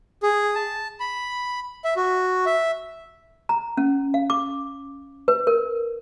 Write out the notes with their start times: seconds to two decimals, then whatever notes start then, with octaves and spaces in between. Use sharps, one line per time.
0.23 G#4
0.55 A5
1.00 B5
1.84 E5
1.96 F#4
2.46 E5
3.49 A#5
3.77 C#4
4.14 F5
4.30 D6
5.28 B4
5.47 A#4